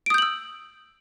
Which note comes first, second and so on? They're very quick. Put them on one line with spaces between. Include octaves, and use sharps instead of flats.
D7 D#6 G6 F#7 E6